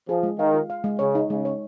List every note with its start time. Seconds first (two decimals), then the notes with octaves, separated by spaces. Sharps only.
0.09 F3 G#4
0.23 G#3
0.39 D#3 F5
0.54 F4
0.70 F5
0.84 G#3
0.99 C#3 C#5
1.15 D#4
1.30 C#3 G#3
1.45 C#5